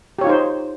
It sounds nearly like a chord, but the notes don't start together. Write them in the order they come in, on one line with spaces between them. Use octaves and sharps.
G4 C#5 F4 D#4 C5